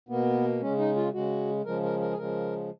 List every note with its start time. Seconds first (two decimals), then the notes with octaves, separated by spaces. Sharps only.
0.09 B2 A#3 B3
0.61 C#3 G#3 C#4
0.78 D#4
0.96 F4
1.13 C#3 G#3 F#4
1.65 C#3 F3 G#3 A#4
1.83 A#4
2.01 A#4
2.11 G#4
2.18 C#3 F3 G#3 A#4